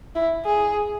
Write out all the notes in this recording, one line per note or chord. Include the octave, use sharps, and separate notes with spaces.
E4
G#4